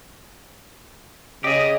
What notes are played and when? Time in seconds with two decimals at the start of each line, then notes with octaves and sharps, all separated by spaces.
1.44 C#3 G4 G#4 D#5